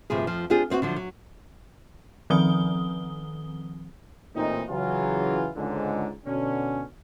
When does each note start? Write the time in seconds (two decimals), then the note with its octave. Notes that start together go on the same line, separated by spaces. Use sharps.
0.10 D2 G2 C3 F3 G#4
0.27 F2 F3
0.50 C4 D4 F4 G4 G#4
0.70 B3 C4 E4 F#4
0.82 D3 F3 F#3
0.96 F#3
2.30 D#3 F3 C4 D#6 G7
4.35 A1 A#2 E3 C4 D#4
4.70 C#3 E3 F#3 F4
5.56 C#2 G#2 D3
6.26 B2 D3 C#4